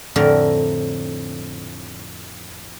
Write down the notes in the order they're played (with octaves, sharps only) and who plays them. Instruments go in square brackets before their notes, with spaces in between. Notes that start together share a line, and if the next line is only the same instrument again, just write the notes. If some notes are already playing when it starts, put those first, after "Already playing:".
[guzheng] F2 A2 D3 A#4